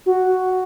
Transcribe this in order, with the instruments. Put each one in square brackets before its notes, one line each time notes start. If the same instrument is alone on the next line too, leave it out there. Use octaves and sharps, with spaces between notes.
[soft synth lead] F#4